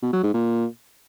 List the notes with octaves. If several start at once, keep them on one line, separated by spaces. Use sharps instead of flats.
B2
F#3
G#2
A#2